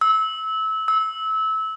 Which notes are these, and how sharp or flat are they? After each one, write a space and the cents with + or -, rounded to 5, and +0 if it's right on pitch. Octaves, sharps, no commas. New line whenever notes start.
E6 -25
E6 -25